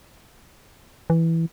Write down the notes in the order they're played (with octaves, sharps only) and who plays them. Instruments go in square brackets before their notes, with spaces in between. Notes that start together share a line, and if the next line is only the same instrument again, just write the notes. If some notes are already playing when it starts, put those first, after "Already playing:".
[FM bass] E3